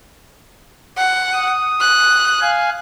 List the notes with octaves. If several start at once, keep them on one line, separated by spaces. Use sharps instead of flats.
F#5
D#6
F#6
F5 G#5